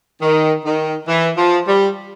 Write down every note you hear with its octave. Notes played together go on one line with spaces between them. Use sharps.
D#3
D#3
E3
F3
G3